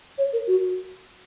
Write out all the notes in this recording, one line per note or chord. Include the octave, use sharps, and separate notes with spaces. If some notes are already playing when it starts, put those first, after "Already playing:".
C#5
A#4
F#4